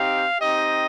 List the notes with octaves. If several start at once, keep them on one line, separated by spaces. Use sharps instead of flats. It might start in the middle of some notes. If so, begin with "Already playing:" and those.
Already playing: C4 D#4 G4 F5
C4 D#4 G4 D#5